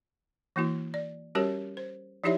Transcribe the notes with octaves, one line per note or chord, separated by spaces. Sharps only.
E3 A#3 E4 F#4
D5
G3 C#4 F#4 G4 A#4 C#5
C5
F3 D#4 E4 G4 C#5 E5